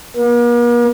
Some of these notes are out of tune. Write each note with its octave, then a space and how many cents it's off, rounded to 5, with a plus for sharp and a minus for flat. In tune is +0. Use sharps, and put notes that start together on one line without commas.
A#3 +45